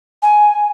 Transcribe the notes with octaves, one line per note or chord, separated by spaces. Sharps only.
G#5